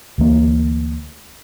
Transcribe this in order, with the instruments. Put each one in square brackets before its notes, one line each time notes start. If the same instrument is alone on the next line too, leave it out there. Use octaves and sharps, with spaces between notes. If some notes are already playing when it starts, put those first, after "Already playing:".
[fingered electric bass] D2 E3 A3 A#3